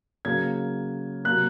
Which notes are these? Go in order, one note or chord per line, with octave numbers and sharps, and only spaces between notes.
C#3 F#3 A#3 G#6
C3 F#3 A#3 F#6